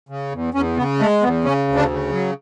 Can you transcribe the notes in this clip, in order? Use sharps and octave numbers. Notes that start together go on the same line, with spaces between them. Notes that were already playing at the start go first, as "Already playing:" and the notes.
C#3
E2
E2 C#4
C#3 B3
G#3 A3
E2 B3
C#3 C#4
D2
D4
C#3
F#3